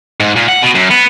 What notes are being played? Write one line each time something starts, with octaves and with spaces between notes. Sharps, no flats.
G#2
A#2
F#5
B2
F#2
B3